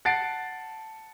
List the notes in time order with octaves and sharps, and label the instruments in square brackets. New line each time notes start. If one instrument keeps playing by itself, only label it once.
[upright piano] F#5 A5 A6 C7 D7